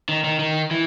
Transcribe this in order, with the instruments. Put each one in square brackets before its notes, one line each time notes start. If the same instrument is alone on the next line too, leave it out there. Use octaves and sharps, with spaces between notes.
[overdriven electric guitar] D#3
D#3
D#3
E3